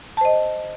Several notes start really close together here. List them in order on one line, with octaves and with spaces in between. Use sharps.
A5 C5 D#5